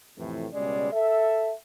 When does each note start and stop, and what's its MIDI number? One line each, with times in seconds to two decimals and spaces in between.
0.18 0.47 41
0.18 0.47 45
0.18 0.47 48
0.18 0.47 52
0.53 0.92 37
0.53 0.92 47
0.53 0.92 55
0.53 0.92 56
0.53 0.92 61
0.53 0.92 74
0.93 1.53 69
0.93 1.53 76